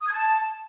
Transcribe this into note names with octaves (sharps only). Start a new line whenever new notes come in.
D#6
G#6
A5